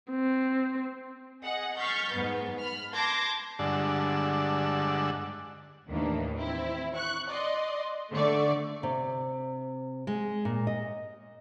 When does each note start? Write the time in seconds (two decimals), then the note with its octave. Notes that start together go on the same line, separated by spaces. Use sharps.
0.11 C4
1.43 G#4 D#5 F#5
1.77 C#6 F6 G6 A6 B6 C7
2.11 G#2 B3
2.58 B5 F6
2.93 A5 C6 D6 G6 G#6 A#6
3.59 G2 D3 G#3 D4 F#5 E6
5.88 D#2 A2 D#3 E3 A#3 D4
6.36 C4 E4
6.94 C#6 F#6
7.28 D5 D#5 C6
8.12 D3 A3 D5 C#6
8.83 C3
10.07 G#3
10.45 A#2
10.67 D#5